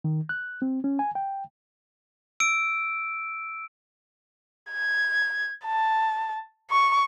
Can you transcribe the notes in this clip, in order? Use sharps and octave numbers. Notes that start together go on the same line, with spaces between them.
D#3
F#6
C4
C#4
G#5
G5
E6 D7
G#6
A5
C#6